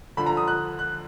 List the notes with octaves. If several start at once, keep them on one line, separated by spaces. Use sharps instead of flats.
D3 F3 B5
A#5
D#6
F#6
F#6